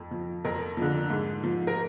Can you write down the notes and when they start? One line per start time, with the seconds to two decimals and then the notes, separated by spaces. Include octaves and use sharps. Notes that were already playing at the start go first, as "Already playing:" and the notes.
Already playing: F2
0.11 F3
0.45 F2 A#4
0.77 D3 F3
1.10 G#2
1.44 F3
1.67 A#4